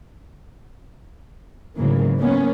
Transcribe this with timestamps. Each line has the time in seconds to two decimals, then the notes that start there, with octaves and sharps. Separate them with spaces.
1.77 D2 G#2 C#3 E3 F#3 A#3
2.17 F#3 A#3 B3 C#4